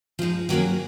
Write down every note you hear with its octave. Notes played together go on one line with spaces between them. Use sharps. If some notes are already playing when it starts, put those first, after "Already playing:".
F3 G#3 D#4
D#3 F#3 A#3 C#4 G#4